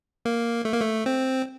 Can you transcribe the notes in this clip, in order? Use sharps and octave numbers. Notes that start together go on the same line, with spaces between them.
A#3
A3
A#3
A3
C4